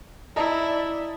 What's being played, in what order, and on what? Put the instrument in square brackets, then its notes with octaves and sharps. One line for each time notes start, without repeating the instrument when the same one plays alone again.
[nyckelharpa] E4 [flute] D5 [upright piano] D#5 A5 A#5